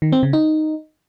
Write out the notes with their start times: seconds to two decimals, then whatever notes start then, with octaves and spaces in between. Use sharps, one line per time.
0.02 D#3
0.12 C4
0.23 C#3
0.33 D#4